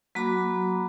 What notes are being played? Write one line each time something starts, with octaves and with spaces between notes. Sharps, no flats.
F#3 A#3 F#4 A#5 B5 D6